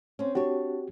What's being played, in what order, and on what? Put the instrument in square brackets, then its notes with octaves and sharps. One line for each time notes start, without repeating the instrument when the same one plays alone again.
[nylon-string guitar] C4 C#4
[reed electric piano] C4 F#4 G4 [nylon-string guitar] D4 C#5